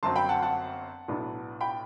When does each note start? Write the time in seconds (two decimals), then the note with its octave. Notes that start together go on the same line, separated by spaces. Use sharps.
0.03 G1 F#2 F#3 C4 A5 C6
0.16 G5 B5
0.29 F#5 A5
0.42 F#5 A5
1.08 B1 A2 F#3 B3 D4
1.61 G5 B5